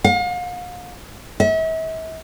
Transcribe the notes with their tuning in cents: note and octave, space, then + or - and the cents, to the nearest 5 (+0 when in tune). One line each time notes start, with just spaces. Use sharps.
F5 +40
E5 -40